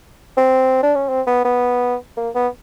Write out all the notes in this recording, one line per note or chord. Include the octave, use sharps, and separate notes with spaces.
C4
D4
C#4
C4
B3
B3
A#3
B3